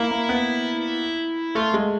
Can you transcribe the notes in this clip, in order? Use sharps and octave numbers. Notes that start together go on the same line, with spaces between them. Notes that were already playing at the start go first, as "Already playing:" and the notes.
Already playing: A#3 E4
A#3
B3
A3 F4
G#3